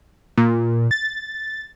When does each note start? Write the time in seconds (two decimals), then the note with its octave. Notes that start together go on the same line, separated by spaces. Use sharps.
0.37 A#2
0.91 A6